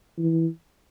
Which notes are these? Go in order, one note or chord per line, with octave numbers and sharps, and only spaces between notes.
E3